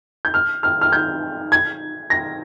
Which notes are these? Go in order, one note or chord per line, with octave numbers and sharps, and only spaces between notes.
G6
F6
F6
F6
G6
G#6
A#6